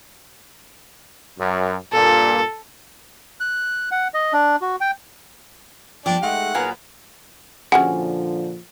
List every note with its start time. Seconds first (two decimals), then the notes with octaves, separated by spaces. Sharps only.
1.38 F#2
1.93 G2 A#2 A4
3.40 F#6
3.91 F#5
4.14 D#5
4.33 D4
4.61 F#4
4.81 G5
6.06 F3 G3 B3 D4 G4 D6
6.23 G#3 A3 D#4 F#5
6.55 A#2 F#3 B3 G#4 A#4 F5
7.72 A#2 D3 F3 C#4 F#4 G#4 F#5